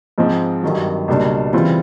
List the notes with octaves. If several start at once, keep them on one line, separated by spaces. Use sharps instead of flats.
G#2 F3 G#3 C4
G#1 G2 D#3 F#3
C#2 B2 G3 A#3 D4
C#3 E3 G3 C4 F4